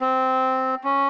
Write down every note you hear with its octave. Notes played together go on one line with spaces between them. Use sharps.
C4
C#4